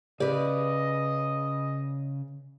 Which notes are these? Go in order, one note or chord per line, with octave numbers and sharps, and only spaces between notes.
C#3 G4 G#4 B4 D5 D#5